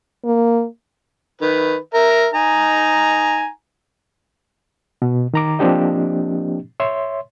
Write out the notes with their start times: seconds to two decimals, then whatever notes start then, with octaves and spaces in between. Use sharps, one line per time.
0.25 A#3
1.41 D#3 B4
1.94 A#4 E5
2.34 D#4 G#5 A#5
5.02 B2
5.34 D#3 A#5 D6
5.59 F3 A#3 C4 D4 G4 D#5
6.80 C#5 E5 C6